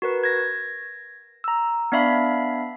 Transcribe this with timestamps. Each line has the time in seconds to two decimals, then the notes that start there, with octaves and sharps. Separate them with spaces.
0.02 F#4 A#4 B4
0.24 G#6 A#6
1.44 A#5 E6
1.92 B3 D4 D5 E5 F5 B5